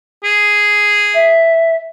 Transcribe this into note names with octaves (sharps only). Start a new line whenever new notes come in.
G#4
E5